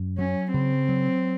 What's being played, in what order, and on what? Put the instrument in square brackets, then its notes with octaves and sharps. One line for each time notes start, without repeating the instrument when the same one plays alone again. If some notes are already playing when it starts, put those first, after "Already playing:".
Already playing: [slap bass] F#2
[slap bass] F#3 [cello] C#4
[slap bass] C#3 [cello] C4
[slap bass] F#3